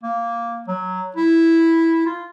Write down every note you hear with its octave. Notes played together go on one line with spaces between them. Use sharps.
A#3
F#3
E4
F4